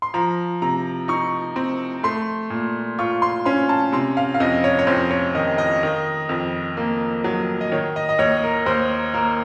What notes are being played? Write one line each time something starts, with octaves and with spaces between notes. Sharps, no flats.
C6
F3 A#5
C3 A#5
D#4 C#6
C4
A3 C6
A#2
F4 C#6
C6
C#4 C6
A5
C3 C6
F5
F5
F2 D#5
C#5
C#5
F2 C5
C#5
D#3 D#5
D#5
D#3
F2
A#3
F#3
D#5
D#3 C#5
D#5
D#5
D#2 C#5
A#4
D#2 C5
A#3 A#4